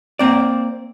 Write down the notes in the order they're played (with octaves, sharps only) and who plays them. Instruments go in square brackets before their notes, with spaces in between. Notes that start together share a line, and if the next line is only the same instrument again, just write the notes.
[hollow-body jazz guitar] A#3 C4 D5